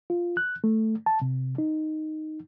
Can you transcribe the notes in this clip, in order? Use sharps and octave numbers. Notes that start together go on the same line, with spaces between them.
F4
F#6
A3
A5
C3
D#4